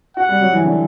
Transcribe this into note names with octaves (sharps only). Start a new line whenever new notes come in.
F#4 F#5
G3
F#3
E3
D3